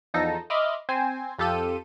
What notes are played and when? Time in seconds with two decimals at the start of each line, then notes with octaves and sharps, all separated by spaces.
0.14 E2 F3 D#4 A4 A#6
0.50 D#5 E5 B5 C6 D6 F6
0.89 C4 C5 G#5
1.39 F2 F4 G4 A4 G6 D#7